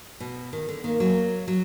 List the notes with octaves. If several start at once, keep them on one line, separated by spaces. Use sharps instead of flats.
B2
D#3
D3
D#3 A#3
F#3
F#3